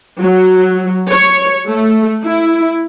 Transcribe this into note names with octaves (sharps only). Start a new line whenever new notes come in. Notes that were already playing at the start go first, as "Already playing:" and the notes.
F#3
C#5
A3
E4